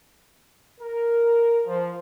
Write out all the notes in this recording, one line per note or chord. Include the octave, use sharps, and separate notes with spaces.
A#4
F3